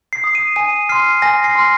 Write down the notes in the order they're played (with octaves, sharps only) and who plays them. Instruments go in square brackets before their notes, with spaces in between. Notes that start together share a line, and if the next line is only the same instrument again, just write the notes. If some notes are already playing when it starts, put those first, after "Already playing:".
[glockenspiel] C7
D#6
D#7
G#5 D#7
C6 F6 C7
G#5 A#6
C7
C6 F6